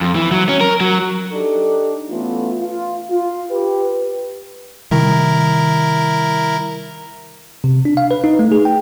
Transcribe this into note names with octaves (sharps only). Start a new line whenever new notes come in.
F2
E3
F#3
C#4
A#4
F#3
D4 D#4 G4 A4
E3 A3 B3 C#4 F4
F4
F4
G4 B4
C3 D#3 G3 E4 A#4 A#5
C3
D4
F5
B4
D#4
A3
G#4
G5